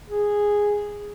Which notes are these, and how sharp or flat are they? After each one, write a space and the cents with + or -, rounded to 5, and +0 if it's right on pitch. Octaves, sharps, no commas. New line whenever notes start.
G#4 -5